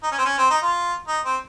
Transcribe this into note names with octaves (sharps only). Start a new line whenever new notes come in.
D#4
C#4
C4
C#4
C4
D#4
F4
D#4
C4